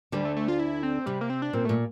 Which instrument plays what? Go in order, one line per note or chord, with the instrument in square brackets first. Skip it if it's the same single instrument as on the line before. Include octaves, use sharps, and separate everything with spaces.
[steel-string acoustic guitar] D2 D3 [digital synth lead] G3
[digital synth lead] A3
A3
F4
E4
C4
[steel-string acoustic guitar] C3 [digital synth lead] G3
[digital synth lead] A#3
C4
D4
[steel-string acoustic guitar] A#2 [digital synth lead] C4
[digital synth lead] A3
[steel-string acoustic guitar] A#2